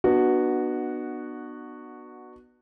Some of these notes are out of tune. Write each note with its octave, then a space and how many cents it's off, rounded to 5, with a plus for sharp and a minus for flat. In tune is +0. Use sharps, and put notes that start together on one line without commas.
B3 -10 D4 +40 F#4 +0